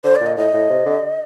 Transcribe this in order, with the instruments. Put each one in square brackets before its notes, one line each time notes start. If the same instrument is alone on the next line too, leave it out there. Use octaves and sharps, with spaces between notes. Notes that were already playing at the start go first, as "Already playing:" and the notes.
[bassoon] D3 [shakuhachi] C5
[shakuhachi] D5
[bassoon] A#2
[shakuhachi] D#5
[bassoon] A2 [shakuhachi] D#5
[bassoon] A2
C3
D3